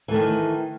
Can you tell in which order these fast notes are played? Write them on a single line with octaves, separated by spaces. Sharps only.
E3 A3 D#3